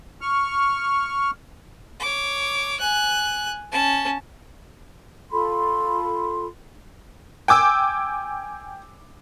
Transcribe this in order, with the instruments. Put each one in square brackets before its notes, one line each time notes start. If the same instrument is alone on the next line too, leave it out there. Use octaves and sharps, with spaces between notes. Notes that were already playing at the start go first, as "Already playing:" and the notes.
[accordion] C#6 F6
[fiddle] C#5 D6
G#5 F#6
C#4 A5
[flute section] F4 A4 B5 C6
[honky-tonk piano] G5 G#5 D6 E6